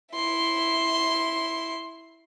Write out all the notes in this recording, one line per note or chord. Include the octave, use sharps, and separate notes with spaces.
E4 C6